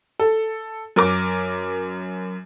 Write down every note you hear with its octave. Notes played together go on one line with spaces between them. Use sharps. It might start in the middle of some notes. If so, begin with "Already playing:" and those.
A4
F#2 A#4 D6